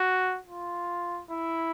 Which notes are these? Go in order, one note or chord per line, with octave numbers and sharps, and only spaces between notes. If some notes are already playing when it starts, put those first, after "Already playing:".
Already playing: F#4
F4
E4